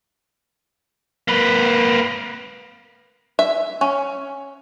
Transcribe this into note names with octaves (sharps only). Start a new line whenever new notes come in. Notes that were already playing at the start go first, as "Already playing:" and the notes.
A#3 B4
E5
C#4